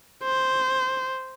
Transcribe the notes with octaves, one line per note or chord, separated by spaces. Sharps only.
C5